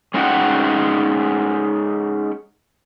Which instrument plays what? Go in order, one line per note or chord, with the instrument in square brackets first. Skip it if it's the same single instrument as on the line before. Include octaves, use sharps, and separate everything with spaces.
[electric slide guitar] G#3 C#4 D#4 F#4 F#5 G5